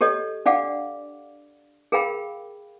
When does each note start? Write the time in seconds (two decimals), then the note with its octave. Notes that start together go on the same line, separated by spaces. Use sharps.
0.01 G4 A4 C#5 D#5
0.46 D4 D5 F5 F#5 D6
1.92 G#4 A#4 F5 G5 B5